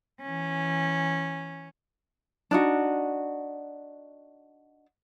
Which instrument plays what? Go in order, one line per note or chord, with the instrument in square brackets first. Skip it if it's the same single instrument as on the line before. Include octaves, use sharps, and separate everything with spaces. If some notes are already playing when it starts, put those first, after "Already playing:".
[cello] E3 C#4
[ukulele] D4 D#4 F#4